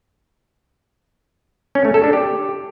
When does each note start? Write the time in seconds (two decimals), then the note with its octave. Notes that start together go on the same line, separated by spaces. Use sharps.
1.75 C#4
1.85 A3
1.94 A4
2.04 D4
2.13 G4